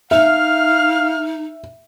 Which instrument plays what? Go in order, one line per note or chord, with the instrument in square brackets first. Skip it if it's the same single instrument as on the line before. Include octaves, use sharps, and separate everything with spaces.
[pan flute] D#4 [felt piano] E5 [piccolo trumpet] F5 [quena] F6